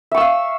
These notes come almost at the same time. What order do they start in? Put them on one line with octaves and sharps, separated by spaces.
E5 C#6 E6 F5